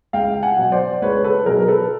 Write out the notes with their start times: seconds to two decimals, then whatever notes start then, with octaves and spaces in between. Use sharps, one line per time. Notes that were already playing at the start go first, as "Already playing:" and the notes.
0.13 C#2 F5 G5
0.43 F#5 G#5
0.58 B2 F#3
0.72 C5 D5
1.02 C#2 B4 C#5
1.24 A4 B4
1.46 B2 F#3 G#4 A#4
1.68 A4 B4